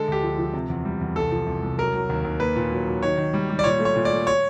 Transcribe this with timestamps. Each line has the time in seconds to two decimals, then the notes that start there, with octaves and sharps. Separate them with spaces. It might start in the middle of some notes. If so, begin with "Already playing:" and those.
Already playing: D3 G#3 A4
0.08 D2 G4
0.23 F3
0.38 F3
0.54 C3
0.70 E2
0.85 G3
1.01 E2
1.16 C2 A4
1.32 F3
1.47 C2
1.63 C2
1.78 F#3 A#4
1.94 F#3
2.09 D#2
2.25 D#2
2.40 A#3 B4
2.56 A#2
2.71 F#3
2.87 F#3
3.03 D#3 C#5
3.17 D#3
3.34 G3
3.50 G3
3.59 D5
3.64 A#2 C#5
3.79 A3
3.85 C#5
3.96 A#2
4.05 D5
4.11 A3
4.27 C#5